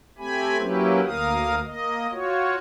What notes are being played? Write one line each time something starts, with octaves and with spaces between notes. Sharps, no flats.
A3 C4 G4 G#5 B5
F#3 A#3 C#4 E4 G4 B4
D2 A#3 A#4 F5 D#6
A#3 D#5
F4 F#4 C#5